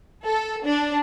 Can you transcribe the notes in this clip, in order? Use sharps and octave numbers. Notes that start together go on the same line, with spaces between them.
A4
D4